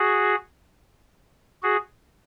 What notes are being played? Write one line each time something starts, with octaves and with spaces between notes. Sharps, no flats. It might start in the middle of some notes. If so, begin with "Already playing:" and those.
Already playing: F#4 G#4
F#4 G#4